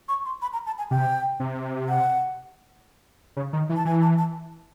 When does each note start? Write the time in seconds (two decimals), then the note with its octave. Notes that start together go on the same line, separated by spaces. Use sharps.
0.08 C#6
0.25 C6
0.42 B5
0.53 A#5
0.66 A5
0.78 G#5
0.91 C3 G5
1.40 C3
1.88 F#5
3.37 C#3
3.53 D#3
3.69 E3
3.76 A5
3.85 E3 G#5
4.02 A5
4.18 A5